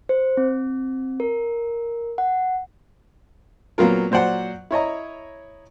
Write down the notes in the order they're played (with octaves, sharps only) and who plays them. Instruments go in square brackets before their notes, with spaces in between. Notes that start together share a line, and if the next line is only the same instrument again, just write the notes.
[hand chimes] C5
C4
A#4
F#5
[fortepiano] A#2 F#3 B3 C4 F4 A#4
A#2 F#3 C5 D5 F#5
E4 C#5 D#5 A#5